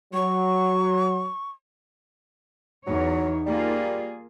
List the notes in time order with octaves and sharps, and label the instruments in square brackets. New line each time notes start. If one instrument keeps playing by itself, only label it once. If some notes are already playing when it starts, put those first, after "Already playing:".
[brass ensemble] F#3 [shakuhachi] C#6
[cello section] E2 C#5 [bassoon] F#3 [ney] D#4
[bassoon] G3 [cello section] A#3 F4 G#4